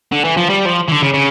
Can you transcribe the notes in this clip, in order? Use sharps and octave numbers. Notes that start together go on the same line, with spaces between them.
D3
E3
F3
G3
F3
E3
D3
C#3
C#3